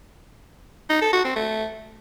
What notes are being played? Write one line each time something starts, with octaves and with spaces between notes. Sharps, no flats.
D#4
A4
F#4
C4
A3